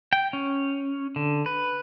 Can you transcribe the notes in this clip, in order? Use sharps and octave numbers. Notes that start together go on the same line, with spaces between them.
G5
C#4
D3
B4